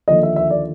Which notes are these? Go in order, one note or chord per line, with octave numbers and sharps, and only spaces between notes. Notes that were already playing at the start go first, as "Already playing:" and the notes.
D#2 D3 F3 D#5
E5
E5
D5